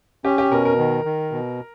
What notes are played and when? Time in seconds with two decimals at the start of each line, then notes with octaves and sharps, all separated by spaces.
0.25 C#4 G4
0.38 G4
0.51 B2 A#4
0.65 A#4
0.78 D#3
1.05 D#3
1.32 B2